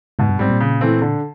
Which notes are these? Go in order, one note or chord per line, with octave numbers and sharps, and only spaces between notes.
G#2 B2
G2
G#2 G3 C4
A#2
C#3
E3 A3 C4
D3